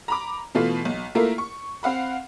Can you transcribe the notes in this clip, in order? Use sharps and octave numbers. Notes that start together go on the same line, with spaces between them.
A#5 B5 D6
B2 E3 A3 F4
B1
A3 A#3 E4 F4 A#4
C#6
C4 F5 F#5 B5